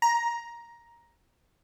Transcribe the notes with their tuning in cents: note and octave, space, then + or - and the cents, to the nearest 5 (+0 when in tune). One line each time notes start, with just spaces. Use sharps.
A#5 +10